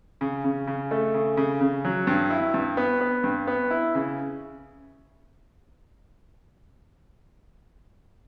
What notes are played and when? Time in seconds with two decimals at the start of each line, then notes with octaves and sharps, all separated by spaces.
0.21 C#3
0.44 C#3
0.67 C#3
0.91 A3
1.14 C#3
1.37 C#3
1.61 C#3
1.85 F#3
2.07 G2
2.30 E4
2.54 G2
2.77 B3
3.01 B3
3.24 G2
3.47 B3
3.71 E4
3.95 C#3